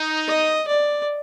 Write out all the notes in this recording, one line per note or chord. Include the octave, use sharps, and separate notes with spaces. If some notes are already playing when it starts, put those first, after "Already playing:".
Already playing: D#4
D#5
D5